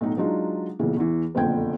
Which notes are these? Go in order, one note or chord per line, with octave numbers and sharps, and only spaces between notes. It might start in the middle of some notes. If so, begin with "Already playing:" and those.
B1 A2 D#4
F#3 G#3 D4 D#4 F4
B1 A#2 C#3 E3
E2 E3
F#1 B1 F2 D3 G5 G#6